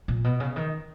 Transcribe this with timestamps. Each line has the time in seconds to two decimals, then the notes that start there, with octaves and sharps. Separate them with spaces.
0.08 A#2
0.24 B2
0.40 C#3
0.56 D#3